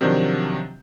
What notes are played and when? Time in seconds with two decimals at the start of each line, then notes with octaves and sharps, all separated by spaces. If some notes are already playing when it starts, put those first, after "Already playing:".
0.01 C3 D#3 F3 F#3 D4 G6